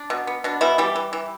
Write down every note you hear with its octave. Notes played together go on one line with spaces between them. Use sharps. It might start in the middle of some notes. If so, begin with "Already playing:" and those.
Already playing: D4
B2
B3
B2 D4
B2 E3 E4
E3 G3 G4
E3
E3